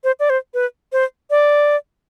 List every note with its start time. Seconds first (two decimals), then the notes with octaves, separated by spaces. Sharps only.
0.04 C5
0.20 D5
0.30 C5
0.54 B4
0.93 C5
1.31 D5